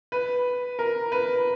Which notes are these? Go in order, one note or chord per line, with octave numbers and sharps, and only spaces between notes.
B4
A#4
B4